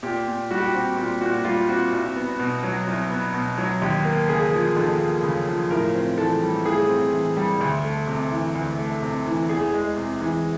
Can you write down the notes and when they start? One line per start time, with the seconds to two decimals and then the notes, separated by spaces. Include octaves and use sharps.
0.03 A#2 G4
0.27 A#2
0.51 G3 F#4
0.58 G4
0.66 F#4
0.74 C4
0.97 A#2 G4
1.21 A#2 F#4
1.34 F#4
1.44 G3 F4
1.69 C4 F#4
1.93 C2
2.16 B3
2.39 B2
2.63 F#3
2.87 C2
3.10 B3
3.34 B2
3.58 F#3
3.82 D#2 G4
4.05 A#3
4.29 C#3 G#4
4.53 F3
4.76 D#2 A4
5.00 A#3
5.23 C#3
5.47 F3
5.71 A2 A#4
5.95 C4
6.18 E3 A4
6.42 G3
6.65 A2 G#4
6.89 C4
7.13 E3
7.37 G3
7.61 D2
7.84 A3
8.07 C3
8.31 E3
8.55 D2
8.79 A3
9.02 C3
9.26 E3
9.49 E2 G#4
9.74 G#3
9.96 C3
10.21 E3